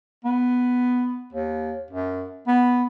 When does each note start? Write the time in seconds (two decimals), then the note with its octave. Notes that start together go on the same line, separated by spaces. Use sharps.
0.24 B3
1.33 D#2
1.90 F#2
2.47 B3